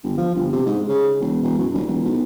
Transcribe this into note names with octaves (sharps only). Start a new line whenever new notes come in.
G1
F3
G1
C3
G#2
C#3
E1
E1
F#2
D#1
E1
B1